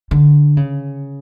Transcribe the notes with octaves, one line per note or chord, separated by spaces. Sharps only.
D3
C#3